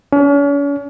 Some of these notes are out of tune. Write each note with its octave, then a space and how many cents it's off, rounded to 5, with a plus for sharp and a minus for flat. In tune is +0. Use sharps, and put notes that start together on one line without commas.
C#4 +40